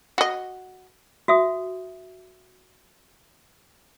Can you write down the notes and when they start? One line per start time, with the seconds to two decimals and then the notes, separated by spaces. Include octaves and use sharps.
0.18 F#4 D#5
1.28 F#4 E5 D#6